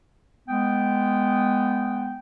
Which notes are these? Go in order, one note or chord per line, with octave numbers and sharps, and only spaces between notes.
G#3 B3 G5